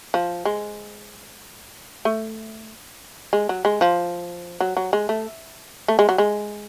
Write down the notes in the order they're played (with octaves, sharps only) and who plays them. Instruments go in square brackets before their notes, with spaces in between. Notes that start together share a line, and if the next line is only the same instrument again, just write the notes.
[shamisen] F3
G#3
A3
G#3
F#3
G#3
F3
F#3
F#3
G#3
A3
A3
G#3
F#3
G#3